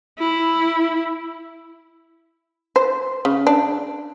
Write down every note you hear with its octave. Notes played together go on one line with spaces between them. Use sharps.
E4
C5
C#3
D4